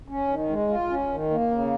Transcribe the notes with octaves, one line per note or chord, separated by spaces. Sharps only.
C#4
D#3
G#3
F4
C#4
D#3
A#3
C#3